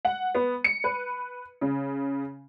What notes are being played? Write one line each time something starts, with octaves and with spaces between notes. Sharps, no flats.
F#5
B3
C#7
B4
C#3